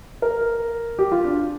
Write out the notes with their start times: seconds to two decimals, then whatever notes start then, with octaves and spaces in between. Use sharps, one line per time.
0.22 A#4
0.99 G4
1.12 F4
1.24 D4